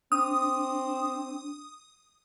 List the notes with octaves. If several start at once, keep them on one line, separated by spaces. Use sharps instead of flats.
C4 D4 D#6